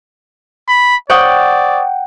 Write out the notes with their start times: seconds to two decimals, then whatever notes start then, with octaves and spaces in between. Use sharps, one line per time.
0.68 B5
1.10 C5 D5 F#5 G5 C#6 D#6